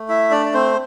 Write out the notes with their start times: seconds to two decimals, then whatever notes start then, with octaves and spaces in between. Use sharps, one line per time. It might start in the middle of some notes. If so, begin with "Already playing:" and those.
Already playing: A3
0.09 E4 E5
0.31 D4 D5
0.46 D5
0.54 C4 C5